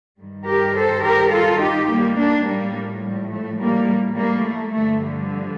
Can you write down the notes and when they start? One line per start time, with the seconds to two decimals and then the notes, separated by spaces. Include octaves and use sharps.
0.20 G2 D#3 G3
0.48 G4 A#4
0.76 A4 C5
1.04 G4 A#4
1.33 F4 A4
1.62 D#4 G4
1.90 G3 A#3
2.18 A#3 D4
2.47 A2 F3 G3 A#3
3.04 G3
3.31 A3
3.60 G3 A#3
4.16 G3 A#3
4.45 A3
4.73 G2 D3 F3 A3
5.02 G3